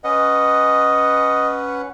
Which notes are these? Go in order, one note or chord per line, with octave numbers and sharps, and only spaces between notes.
C#4 B4 D#5 F#5